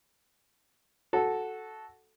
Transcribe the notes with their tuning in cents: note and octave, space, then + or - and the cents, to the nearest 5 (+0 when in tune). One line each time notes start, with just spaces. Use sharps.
F#4 +0 A4 -10